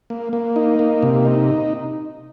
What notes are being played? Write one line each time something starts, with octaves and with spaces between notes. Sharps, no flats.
A#3
A#3
D#4
A#3
C3
D#4